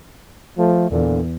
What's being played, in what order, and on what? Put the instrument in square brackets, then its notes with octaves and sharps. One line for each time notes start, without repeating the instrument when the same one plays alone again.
[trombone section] F3 A3
[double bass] E2 [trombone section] A#2 D3